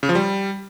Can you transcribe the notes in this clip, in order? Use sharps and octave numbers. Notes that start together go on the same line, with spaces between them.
C#3
F3
G3